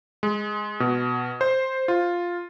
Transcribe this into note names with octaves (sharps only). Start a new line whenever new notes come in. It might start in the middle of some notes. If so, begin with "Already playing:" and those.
G#3
B2
C5
F4